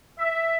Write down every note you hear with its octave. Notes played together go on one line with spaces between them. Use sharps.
E5